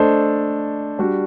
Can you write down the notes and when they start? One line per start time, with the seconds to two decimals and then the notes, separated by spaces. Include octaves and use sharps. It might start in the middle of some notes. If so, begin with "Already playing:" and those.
Already playing: A3 D4 A4 C5 D#5
0.99 G3 D4 F#4